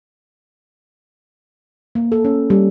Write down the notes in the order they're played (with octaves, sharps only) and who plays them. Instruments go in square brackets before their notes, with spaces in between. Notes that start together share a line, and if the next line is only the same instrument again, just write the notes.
[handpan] A#3
A4
C#4
G3